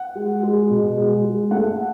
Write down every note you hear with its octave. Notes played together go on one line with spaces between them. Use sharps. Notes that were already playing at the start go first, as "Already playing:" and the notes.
Already playing: F#5
G#3
G#3
B2
G#3
G#3
A3 F#5